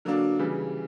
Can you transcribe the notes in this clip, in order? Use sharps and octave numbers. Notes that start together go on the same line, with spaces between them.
D3 F#3 A#3 D4
C#3 E3 G3